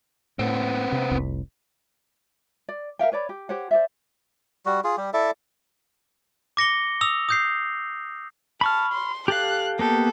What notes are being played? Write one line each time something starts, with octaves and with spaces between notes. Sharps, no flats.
A2 B3 C4
C3
F1 C2
D5
A#4 E5 F5 G5
B4 C#5 D5 B5
G4
G4 C5 C#5 F#5
C5 D5 E5
G3 F#4
F4 G#4
G3 G4
E4 A4 D5 E5
D6 A#6 C#7 G7
D#6 E6 F7
D#6 G6 C7
A5 B5 C#6 F6
C6
G4 A4 F5 F#6
A#3 B3 G4 A4